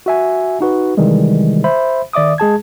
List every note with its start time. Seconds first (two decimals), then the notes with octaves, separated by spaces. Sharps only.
0.06 F#4 E5 G#5
0.61 D#4 F#4 B4
0.97 C3 D#3 E3 G3 G#3
1.64 C5 E5 B5
2.13 D#3 D5 E5 D6 D#6
2.38 G#3 G#4 A5 G#6